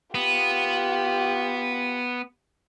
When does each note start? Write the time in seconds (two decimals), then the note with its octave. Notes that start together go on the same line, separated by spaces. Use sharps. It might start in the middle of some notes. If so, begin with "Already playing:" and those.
0.15 B3 F4 G4